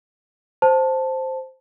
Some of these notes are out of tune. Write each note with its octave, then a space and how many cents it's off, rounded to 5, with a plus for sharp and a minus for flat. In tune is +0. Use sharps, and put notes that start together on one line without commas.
C5 +0 A5 +0